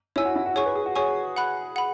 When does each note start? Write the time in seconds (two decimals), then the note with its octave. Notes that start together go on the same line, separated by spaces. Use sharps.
0.16 E4 C#5 G#5 E6
0.25 F#4
0.36 E4
0.46 F#4
0.56 G#4 C#5 G#5 C#6
0.65 B4
0.76 G#4
0.86 F#4
0.95 G#4 C#5 G#5 C#6
1.37 F#5 B5 F#6
1.76 F#5 B5